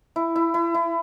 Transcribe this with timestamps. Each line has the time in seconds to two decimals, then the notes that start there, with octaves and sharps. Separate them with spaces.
0.16 E4
0.36 E4
0.54 E4
0.74 E4